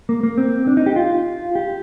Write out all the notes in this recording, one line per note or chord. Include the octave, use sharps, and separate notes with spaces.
A#3
A#3
C4
D4
D#4
G4
F4
G4